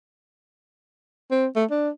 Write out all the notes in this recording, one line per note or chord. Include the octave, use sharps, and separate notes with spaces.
C4
A3
D4